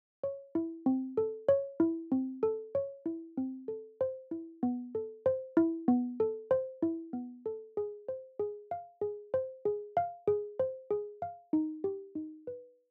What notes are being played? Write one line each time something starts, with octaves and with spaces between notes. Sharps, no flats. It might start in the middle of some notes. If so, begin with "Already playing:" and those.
C#5
E4
C4
A4
C#5
E4
C4
A4
C#5
E4
C4
A4
C5
E4
B3
A4
C5
E4
B3
A4
C5
E4
B3
A4
G#4
C5
G#4
F5
G#4
C5
G#4
F5
G#4
C5
G#4
F5
D#4
G4
D#4
B4